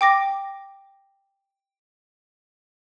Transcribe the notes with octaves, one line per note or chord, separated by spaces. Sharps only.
G5 D6 A#6